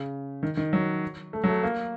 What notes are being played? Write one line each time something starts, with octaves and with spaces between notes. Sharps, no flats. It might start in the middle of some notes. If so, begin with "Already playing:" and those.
Already playing: C#3
D#3
D#3
F#3
A3
F#3
A3
A#3